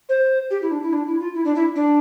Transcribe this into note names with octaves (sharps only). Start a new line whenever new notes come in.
C5
G4
E4
D4
E4
D4
E4
F4
E4
D4
E4
D4